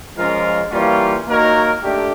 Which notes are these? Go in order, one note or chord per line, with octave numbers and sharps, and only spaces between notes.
F3 G#3 C#4 F4 A#4
E3 G3 A#3 C#4 F4
A#3 D#4 F#4 A#4 C#5
A3 D4 G4